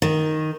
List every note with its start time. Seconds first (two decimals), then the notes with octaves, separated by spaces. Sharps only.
0.02 D#3